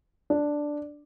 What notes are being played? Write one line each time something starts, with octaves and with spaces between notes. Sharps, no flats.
D4